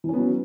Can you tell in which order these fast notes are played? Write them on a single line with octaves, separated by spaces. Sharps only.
E3 C#4 B3 F#3